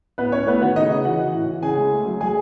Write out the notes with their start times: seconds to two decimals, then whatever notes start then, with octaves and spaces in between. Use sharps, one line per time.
0.18 A2 B3 B4
0.32 A2 C#4 C#5
0.46 A3 B3 B4
0.61 D#3 F#4 F#5
0.76 C#3 D#4 D#5
0.90 C#3
1.04 E3 F#4 F#5
1.20 E3
1.34 A2
1.49 E3
1.62 C#3 G#4 G#5
1.78 G#3
1.92 A3
2.06 F#3
2.21 F#3 G#4 G#5